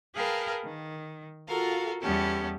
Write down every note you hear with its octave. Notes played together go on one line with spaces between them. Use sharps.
G#4 A#4 B4 F5 G5 A5
D#3
F4 F#4 A4 A#4 F5
E2 G3 B3 C#4 G4 A4